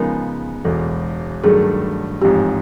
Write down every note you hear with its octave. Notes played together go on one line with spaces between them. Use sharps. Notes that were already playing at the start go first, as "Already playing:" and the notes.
Already playing: C#3 F3 G#3 B3 D#4 A#4
E1 E2 B2 A4
G2 D#3 F#3 A3 G#4
A1 G#2 F3 G#3 C4 G4